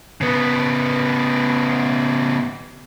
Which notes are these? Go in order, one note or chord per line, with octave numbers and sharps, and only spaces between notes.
C#3 B3